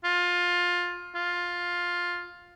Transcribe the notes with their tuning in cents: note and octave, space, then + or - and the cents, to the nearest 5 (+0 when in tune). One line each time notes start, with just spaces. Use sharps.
F4 +20
F4 +10